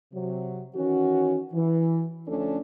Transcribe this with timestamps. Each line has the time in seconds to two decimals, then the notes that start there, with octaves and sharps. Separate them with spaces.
0.13 C3 F#3
0.75 D#3 E3 C#4 F#4
1.53 E3
2.28 D2 F3 A3 C#4 D4 A4